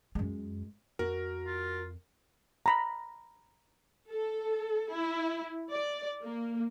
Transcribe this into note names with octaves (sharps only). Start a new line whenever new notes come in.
F#2 G#3
F2 F#4 A#4
F4
A#5 B5
A4
E4
D5
A#3